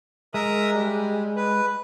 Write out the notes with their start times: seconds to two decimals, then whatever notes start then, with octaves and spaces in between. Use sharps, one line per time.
0.34 G#3 A#4 E5 D#6
0.74 G3
1.36 B4